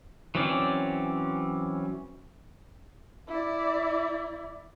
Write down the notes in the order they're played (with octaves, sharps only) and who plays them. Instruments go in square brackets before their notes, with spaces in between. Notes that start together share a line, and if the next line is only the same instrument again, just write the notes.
[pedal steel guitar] E3 F#3 C4 C#4 D5
[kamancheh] E4 D5